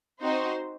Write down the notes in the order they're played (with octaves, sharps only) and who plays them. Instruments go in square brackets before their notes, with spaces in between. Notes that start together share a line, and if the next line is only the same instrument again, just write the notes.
[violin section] C4 D#4 F#4 C5